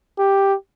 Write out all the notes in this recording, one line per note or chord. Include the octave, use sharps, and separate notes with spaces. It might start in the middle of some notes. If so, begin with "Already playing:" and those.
G4